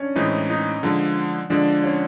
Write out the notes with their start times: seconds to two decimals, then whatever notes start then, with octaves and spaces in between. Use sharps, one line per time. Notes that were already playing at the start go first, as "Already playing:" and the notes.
Already playing: C#4 D4
0.16 A2 E3 G#3 C4 D#4
0.50 D#4
0.83 D3 F3 G#3
1.50 D3 F3 G#3 D4
1.84 C#4